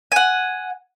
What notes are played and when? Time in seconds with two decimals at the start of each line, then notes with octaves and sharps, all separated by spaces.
0.12 F#5 G#5